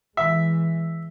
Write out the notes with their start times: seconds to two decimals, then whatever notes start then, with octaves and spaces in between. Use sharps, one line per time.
0.17 E3 G#3 E5